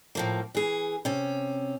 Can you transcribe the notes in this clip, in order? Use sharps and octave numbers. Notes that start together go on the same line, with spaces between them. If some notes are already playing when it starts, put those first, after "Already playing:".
A2 F3 A#3
E3 G#4
C3 C#4